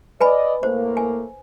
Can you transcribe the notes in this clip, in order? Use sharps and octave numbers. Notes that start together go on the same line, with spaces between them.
B4 D5 D#5 G#5 B5
A2 A3 A#3 C5
G#5